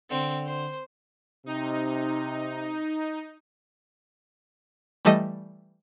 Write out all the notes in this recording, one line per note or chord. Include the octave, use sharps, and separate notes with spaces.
D3 C4
C5
C3 D#4
E3 G3 A3 A4 D#5